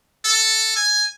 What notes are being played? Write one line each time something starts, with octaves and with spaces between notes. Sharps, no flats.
A4
G#5